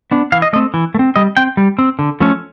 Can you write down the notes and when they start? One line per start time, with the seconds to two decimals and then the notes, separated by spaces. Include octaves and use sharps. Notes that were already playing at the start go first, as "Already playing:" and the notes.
0.11 B3 D4
0.32 E3 F5
0.42 D#5
0.53 A3 C4 D#5
0.74 E3
0.95 A3
0.99 C4
1.16 G3 D#5
1.37 C4 G5
1.57 G3
1.79 C4
1.99 D3
2.20 F3 A3 C#4